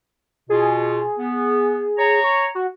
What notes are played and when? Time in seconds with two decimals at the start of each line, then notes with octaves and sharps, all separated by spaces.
0.49 B2 F4 G#4
1.19 B3
1.98 C#5 A#5
2.24 C#6
2.55 F#4